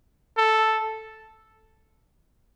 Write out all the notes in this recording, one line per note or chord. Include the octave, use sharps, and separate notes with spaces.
A4